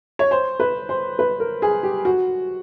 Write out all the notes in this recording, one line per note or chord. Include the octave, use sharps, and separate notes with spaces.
C#5
C5
B4
C5
B4
A#4
G#4
G4
F#4